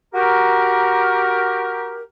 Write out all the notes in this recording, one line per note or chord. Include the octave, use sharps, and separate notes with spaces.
F#4 G4 A#4